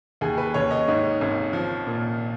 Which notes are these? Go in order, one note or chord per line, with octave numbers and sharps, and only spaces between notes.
D#2 G#4
B4
D#2 C#5
D#5
G#2 C#5
G#1
F3
A#2